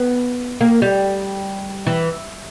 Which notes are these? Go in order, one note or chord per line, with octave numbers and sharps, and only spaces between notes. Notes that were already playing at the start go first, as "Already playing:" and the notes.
Already playing: B3
A#3
G3
E3